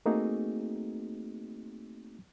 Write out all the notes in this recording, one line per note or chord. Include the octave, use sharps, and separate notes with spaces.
A3 A#3 C4 D#4 F#4 G#4